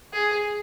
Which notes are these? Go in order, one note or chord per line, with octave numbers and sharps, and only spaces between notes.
G#4